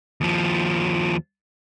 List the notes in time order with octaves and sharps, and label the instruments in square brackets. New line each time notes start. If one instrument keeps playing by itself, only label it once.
[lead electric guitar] D#2 F3